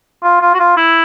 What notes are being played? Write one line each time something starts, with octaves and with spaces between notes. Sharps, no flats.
F4
F4
F#4
F4
E4